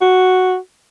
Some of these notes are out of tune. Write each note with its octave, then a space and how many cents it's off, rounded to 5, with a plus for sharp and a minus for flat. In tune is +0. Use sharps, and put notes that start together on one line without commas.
F#4 +0